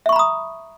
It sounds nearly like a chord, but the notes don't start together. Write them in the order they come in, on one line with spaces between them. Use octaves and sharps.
E5 C#6 B5 A#5 D#6